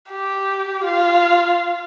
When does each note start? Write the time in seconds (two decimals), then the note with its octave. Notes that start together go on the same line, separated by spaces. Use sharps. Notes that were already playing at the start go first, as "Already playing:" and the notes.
0.11 G4
0.84 F4